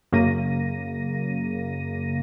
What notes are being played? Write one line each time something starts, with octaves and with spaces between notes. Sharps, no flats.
F#2 C#3 A#3 A#6 D#7